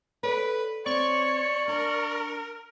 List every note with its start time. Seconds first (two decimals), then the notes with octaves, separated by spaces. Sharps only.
0.23 A4 B4 C#5 D5
0.86 C4 C#5 D5 C#6
1.68 D4 A#4